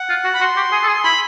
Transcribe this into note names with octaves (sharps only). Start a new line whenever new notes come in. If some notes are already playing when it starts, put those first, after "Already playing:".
Already playing: F#5
F4
F#4
B5
F#4 C6
G4
G#4
A4
G#4
E4 B5